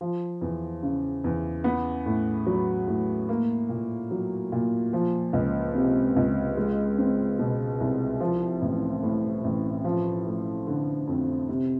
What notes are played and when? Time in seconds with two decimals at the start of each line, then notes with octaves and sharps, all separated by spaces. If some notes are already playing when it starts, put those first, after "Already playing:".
0.01 F3
0.41 E2
0.83 C#3
1.24 E2
1.64 B3
2.06 A2
2.46 F#3
2.88 A2
3.29 A#3
3.69 A#2
4.11 F#3
4.52 A#2
4.93 F3
5.33 C#2
5.75 C3
6.16 C#2
6.57 G#3
6.98 C4
7.39 B2
7.80 C2
8.20 F3
8.62 A1
9.03 A2
9.44 A1
9.85 F3
10.26 A3
10.67 D3
11.07 F2
11.49 C3